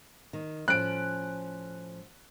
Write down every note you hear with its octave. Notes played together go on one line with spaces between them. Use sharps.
D#3
A2 F3 C#4 F#6 D7